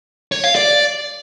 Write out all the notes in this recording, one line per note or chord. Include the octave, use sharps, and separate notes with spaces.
C#5
F5
D5